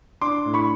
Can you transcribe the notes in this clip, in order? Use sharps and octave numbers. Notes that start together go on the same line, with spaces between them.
D4 C6 D6
A2
B5 C#6